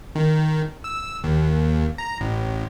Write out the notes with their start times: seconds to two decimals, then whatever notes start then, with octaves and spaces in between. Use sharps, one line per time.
0.15 D#3
0.84 E6
1.24 D#2
1.98 A#5
2.21 A1